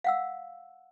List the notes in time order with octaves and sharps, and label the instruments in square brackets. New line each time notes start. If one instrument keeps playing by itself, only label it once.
[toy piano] F5 F#5 E6